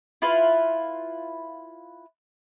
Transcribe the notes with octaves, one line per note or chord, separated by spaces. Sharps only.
E4 F4 B4